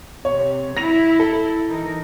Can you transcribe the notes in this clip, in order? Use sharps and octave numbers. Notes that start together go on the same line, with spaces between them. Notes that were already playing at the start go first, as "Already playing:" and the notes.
C3 C#5
E4 A#6 F7
A4
E3 D#4 A#4